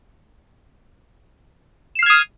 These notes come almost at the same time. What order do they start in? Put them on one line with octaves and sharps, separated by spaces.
E7 C7 F6 G#6 D#6